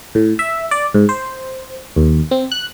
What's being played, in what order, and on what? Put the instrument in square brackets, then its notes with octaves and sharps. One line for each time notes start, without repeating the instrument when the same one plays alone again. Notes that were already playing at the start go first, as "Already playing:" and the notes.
[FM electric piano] A2
E5
D5
G#2
C5
D#2
C4
F#6